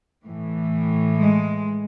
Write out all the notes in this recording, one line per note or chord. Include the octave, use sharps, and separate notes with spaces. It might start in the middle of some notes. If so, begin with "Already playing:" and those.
A2 E3
G#3